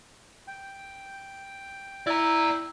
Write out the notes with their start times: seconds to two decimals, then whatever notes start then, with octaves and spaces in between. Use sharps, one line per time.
0.47 G5
2.07 E4 D5 A#5